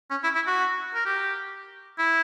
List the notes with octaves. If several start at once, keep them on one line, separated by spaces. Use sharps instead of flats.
C#4
E4
E4
F#4
A#4
G4
E4